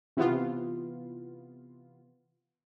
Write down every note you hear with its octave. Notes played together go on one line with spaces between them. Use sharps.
C3 E3 B3 F4